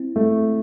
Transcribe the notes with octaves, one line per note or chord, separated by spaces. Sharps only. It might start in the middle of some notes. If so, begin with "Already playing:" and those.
Already playing: C4 E4
A3